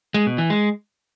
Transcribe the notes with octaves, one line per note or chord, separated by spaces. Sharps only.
G#3
B2
E3
G#3